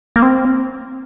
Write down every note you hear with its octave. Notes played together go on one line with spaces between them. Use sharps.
A#3
C4